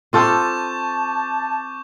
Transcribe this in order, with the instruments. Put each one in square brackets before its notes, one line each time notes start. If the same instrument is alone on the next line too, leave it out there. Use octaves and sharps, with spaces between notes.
[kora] C4 F4 A4 [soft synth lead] A5 [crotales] C#6 D6 G6